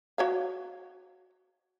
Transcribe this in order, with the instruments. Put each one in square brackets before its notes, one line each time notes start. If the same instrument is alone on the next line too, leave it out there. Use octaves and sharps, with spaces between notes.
[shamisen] F#4 C#5 F5